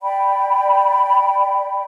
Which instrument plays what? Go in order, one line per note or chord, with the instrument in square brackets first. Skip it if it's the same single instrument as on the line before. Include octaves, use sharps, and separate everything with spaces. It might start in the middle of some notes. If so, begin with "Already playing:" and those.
[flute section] D5 G5 B5